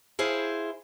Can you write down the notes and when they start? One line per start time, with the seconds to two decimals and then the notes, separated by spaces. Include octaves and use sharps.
0.19 E4 G#4 C5 F5